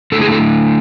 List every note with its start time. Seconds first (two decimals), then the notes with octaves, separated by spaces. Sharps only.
0.12 D3 A3 E4 A4
0.22 G#4
0.32 A4